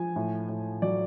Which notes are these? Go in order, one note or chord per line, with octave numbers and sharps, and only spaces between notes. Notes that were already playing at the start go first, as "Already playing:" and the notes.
Already playing: F3 G#5
A2
A2
F#3 D5